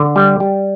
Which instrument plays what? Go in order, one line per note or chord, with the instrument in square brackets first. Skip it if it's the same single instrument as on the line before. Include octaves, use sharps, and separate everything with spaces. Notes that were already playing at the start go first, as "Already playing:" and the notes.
Already playing: [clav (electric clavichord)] D3
G3
G3